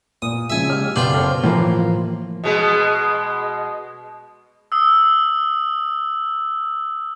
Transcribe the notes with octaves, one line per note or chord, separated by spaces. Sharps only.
A#2 D#6
C#3 F3 G#3 E5 G#5
C#3 G#3 G4 E6 F6
F#1 B2 B3 D4 F4 G5 G6
A4 A#4 C5 C#5
A2 E3 F3 A#3
B2 G#3
D#6 E6